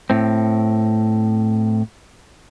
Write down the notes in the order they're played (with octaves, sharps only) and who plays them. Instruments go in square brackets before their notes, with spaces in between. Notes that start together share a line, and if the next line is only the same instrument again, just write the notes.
[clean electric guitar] A2 C4